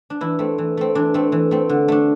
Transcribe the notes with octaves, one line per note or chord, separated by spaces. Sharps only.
D4
E3 E4
A3 C4
E3
A3 C4
E3 D4
A3 C4
E3
A3 C4
D3
A3 D4